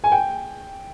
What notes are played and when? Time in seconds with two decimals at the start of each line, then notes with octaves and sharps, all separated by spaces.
0.04 G#5
0.12 G5